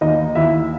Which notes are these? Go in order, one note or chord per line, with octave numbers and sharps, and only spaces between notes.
D#2 D#4 D#5
D#2 E4 E5